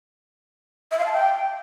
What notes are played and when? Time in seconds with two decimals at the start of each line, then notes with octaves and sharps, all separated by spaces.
0.91 E5
0.99 F5
1.06 A5
1.13 G5